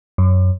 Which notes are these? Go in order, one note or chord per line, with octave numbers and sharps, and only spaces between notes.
F#2